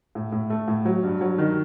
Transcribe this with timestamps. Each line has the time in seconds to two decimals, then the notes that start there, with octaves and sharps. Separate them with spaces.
0.15 A2
0.32 A2
0.50 A3
0.68 A2
0.85 F#3
1.03 G2
1.21 F#3
1.38 D#3